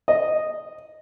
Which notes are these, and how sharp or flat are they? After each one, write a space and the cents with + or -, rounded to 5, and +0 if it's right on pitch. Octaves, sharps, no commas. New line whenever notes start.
D#5 -5